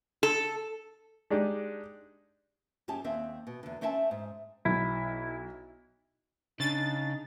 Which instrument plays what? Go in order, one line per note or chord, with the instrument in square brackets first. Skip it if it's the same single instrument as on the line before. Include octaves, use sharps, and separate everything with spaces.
[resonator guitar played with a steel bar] A4
[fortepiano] G#3 D4 D#4 G4
[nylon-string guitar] F#2 C#4 G4 G#4 A5
D#2 C4 E5
B2
E2 D3
A3 C4 C#4 E5 G#5 A5
G#2
[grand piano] B1 [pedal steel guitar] E4
[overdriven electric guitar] C#3 [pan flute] D4 [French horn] D#4 [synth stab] A6